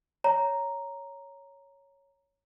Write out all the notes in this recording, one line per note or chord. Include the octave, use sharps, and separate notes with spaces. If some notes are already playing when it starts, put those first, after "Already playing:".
C#5 A#5